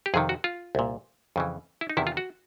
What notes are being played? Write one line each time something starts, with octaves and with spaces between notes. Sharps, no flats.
G4
F2 C3 D#3 G#4
F#4
F4
C2 A#2
F2 C#3 E3
E4
D#4
E2 C3 D#3 E4
F4
F#4